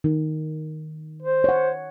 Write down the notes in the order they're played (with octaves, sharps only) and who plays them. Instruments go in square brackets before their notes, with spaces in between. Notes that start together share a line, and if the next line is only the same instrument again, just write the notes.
[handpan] D#3
[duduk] C5
[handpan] C#5 F#5